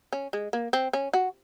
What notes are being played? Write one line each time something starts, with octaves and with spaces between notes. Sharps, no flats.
C#4
G#3
A#3
C4
C#4
F#4